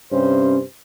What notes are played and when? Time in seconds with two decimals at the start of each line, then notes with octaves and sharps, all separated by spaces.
0.12 G2 C3 C#4 C5